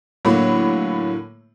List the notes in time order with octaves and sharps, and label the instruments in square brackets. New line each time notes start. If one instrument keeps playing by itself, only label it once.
[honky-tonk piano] A2 A#3 B5 [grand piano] D3 F#3